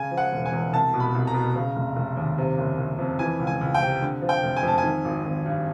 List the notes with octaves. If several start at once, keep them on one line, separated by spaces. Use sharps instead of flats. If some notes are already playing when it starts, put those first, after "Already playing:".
Already playing: C#3 G#5
F3
F#5
E1
G#5
E2
C2 A5
B2
B5
C2
A#5
B2
C#3
F1
F1
D#2
C3
F#1
F#1
F2
E3 G#5
C#2
G#5
C#2
G5
C3
D3
F3
G5
F1
G#5
F2 A5
G#5
D#3
G#1
G#1
G2